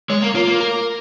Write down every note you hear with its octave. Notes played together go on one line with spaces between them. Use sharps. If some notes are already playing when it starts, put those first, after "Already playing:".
G#3 C#5
A#3
A#3 F4
A#3
A#4